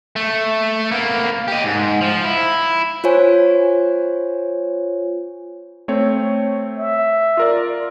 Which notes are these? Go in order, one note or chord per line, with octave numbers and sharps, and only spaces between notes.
A3
A#3 B3
G4 D#5
G#2
F3
E4
F4 C5 C#5 G#5
A3 C4 C#5
E5
F4 A#4 D5